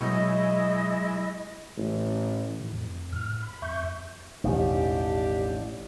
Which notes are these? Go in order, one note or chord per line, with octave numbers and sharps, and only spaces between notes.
B2 F#3 G#3 E4 D#5 C#6
A1
A2 D#3
F2
A2 F6
B5
F2 E5 C#6 G6
A1 E2 B2 D#3 D4 G4